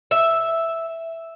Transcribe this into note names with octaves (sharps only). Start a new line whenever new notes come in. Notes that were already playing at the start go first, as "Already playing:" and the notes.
E5